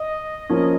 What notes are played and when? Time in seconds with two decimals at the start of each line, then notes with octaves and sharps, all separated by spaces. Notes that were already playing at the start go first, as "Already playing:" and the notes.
Already playing: D#5
0.49 F3 A#3 C#4